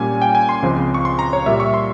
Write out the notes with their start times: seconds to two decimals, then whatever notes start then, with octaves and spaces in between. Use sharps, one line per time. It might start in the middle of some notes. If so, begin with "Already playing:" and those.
Already playing: A#2 G3 A#3 C#4 G#5
0.22 G5
0.35 G#5
0.49 C6
0.62 C#2 C#3 F3 G#3 C4
0.94 C#6
1.05 C6
1.19 A#5
1.33 C#5
1.46 A#2 G3 A#3 E5
1.60 C#6
1.74 C6